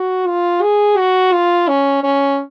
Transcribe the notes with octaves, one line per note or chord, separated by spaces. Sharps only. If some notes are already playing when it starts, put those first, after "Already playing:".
Already playing: F#4
F4
G#4
F#4
F4
C#4
C#4